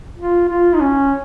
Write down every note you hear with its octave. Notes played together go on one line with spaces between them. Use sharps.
F4
F4
D#4
C#4